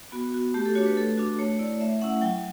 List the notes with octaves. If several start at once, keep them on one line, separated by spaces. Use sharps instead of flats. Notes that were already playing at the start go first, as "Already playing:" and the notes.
B3 F#4
F#4
A3 G4
A4
D4 F#4 C#5
B4
A3 A4
D4 F#4
A3 C#5
E4 D5
A3 E5
C#4 E4 F#5
F#3 G5